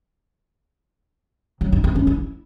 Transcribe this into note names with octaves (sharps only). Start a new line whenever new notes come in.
F#3
D#4
C4
C#4
E4